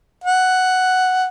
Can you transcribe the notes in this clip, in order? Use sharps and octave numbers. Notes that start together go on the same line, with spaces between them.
F#5